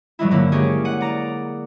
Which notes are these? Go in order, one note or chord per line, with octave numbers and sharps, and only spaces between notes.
G2 F#3 G#3 E4
D3 A#3 E4
A#3 C#4 G4 G#4
F#5 D#7
D5 A#5